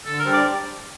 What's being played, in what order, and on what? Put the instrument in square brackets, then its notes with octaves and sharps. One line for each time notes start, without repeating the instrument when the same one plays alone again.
[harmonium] D3 [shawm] A4
[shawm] A#4
[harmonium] G3 D4 G4 C5
[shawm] D5